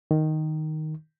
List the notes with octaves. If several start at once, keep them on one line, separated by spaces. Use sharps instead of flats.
D#3